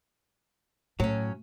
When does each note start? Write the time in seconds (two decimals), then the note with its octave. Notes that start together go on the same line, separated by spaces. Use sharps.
1.00 A2 F#3 C#4